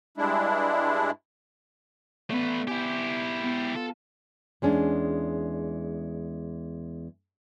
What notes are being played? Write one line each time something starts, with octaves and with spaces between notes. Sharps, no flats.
G2 G#3 D4 E4
A3 B3 B4 D5
E4 G4 G#5 G6
B3
F4 A4
E2 G#3 C#4 D4